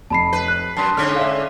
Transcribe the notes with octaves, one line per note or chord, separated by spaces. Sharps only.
F1 A5 B5 C7
B4
F#6
F#2 A5 C6 C7
G#2 D3 C#4 F6
E5 F5